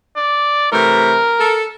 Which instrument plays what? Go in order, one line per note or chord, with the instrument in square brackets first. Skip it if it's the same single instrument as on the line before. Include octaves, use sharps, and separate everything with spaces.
[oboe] D5
[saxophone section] C3 E3 A3 [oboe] A#4
[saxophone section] A4